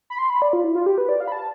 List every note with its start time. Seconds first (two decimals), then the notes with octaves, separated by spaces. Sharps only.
0.10 B5
0.19 C6
0.30 B5
0.42 D5
0.53 F4
0.64 E4
0.75 F4
0.86 G4
0.98 B4
1.09 D5
1.20 F5
1.28 B5
1.32 A5